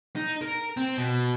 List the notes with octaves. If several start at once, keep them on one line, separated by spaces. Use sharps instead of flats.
D#4
A#4
C4
B2